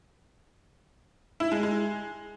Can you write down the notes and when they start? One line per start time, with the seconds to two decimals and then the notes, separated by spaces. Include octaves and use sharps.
1.40 E4
1.52 G#3
1.63 G#3